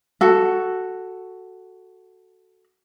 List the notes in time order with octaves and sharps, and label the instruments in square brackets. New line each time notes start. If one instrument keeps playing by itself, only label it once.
[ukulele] F#4 A4